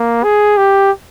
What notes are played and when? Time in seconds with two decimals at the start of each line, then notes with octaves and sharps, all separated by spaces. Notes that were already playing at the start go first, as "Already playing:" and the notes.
Already playing: A#3
0.23 G#4
0.57 G4